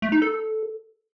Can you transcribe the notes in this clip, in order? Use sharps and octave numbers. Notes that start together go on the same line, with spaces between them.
A3
D#4
A4